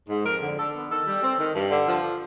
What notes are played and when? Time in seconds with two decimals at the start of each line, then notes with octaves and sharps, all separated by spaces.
0.09 G#2
0.26 F2 A#4
0.42 D3
0.58 D3 A4
0.74 B3
0.90 D#3 A4
1.07 G3
1.23 C4
1.39 D#3
1.54 G2
1.71 D3
1.88 F3